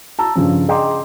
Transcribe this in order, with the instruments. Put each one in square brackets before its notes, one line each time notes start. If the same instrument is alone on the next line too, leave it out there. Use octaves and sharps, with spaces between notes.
[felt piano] A5 A#5 E6
G2 C#3 F3 C#4
G#4 D#5 G5 A#5 C6 D6